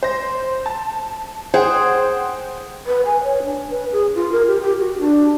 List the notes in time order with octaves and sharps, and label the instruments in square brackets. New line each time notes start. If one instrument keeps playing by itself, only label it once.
[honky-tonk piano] C5 A#6
A5
[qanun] G#4 [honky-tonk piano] C5 F#5 G5
[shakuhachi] B4
G#5
C#5
D4
B4
G#4
F4
A#4
G4
G4
F#4
D4